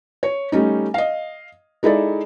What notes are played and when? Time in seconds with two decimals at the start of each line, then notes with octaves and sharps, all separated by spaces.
0.23 C#5
0.52 G3 A3 C#4 D#4
0.94 D#5 F5
1.83 G#3 D#4 E4 A4 D5 E5